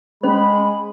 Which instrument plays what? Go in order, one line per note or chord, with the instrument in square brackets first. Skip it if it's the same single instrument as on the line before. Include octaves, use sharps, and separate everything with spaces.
[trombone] G#3 [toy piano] C#4 C5 [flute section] B5